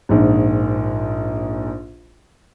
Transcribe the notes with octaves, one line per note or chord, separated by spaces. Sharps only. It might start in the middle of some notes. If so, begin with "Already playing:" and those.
A#1 G#2